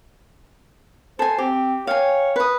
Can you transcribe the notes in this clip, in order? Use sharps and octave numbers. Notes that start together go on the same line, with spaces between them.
A4 C5 G#5
C4 G4
C#5 F5 G5 G#5
B4 D#6